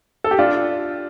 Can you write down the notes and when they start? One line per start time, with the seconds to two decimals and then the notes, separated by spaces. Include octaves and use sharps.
0.24 A4
0.31 G4
0.39 D4 F4